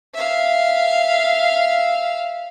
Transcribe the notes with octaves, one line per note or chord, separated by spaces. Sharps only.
E5 F5